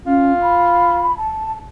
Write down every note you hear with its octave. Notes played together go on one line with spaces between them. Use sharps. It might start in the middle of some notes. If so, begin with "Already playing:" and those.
C#4 F4
B5
A5